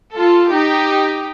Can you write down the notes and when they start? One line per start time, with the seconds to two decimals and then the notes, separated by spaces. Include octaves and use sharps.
0.14 F4 A4
0.50 D#4 G4